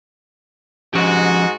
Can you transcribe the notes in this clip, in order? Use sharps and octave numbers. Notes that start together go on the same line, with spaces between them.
G#2 F3 G#3 C#4 F#4 G4